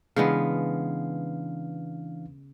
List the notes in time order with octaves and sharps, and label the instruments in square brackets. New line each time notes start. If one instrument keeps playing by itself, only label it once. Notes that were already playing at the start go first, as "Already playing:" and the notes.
[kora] C#3 G#3 B3 [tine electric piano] E3 D4 F5